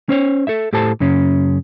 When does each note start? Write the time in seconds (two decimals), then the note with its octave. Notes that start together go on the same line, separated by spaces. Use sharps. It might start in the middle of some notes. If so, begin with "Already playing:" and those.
0.09 C#4 C5 C#5
0.47 A4 E5
0.73 A2 G4 A4 C5 A5
1.00 F#2 C#3 C#4